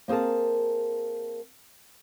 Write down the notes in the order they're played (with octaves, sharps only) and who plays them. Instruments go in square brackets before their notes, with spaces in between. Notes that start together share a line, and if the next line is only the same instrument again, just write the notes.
[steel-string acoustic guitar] A#3 C4 G#4 A#4 A5